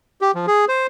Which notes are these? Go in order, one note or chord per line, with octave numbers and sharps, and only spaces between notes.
G4
F3
G#4
C5